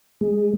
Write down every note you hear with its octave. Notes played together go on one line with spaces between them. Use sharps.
G#3